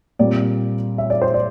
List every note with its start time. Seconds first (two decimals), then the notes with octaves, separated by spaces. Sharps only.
0.19 A#2 G3 C4 D5
0.98 E5
1.10 D5
1.22 C5
1.34 D5